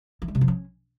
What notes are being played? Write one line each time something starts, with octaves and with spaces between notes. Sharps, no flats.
E3
G#3
C3
F3
C#4